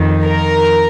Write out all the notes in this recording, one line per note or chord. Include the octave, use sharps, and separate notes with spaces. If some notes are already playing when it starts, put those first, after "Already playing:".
Already playing: F2 D#3
A#4